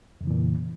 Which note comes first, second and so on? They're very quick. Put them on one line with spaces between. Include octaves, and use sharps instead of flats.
F2 C#3 E3 A#2